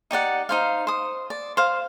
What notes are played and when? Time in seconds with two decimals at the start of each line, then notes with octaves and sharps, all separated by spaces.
0.11 D#4 G4 D5 F#5
0.49 D#4 C5 F5
0.87 C5 D#6
1.30 D5
1.57 C5 F5